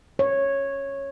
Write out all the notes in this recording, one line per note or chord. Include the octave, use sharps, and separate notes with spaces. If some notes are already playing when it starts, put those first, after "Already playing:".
C#5